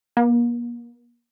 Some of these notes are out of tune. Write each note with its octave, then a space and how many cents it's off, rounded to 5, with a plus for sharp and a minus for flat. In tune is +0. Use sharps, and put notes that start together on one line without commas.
A#3 +40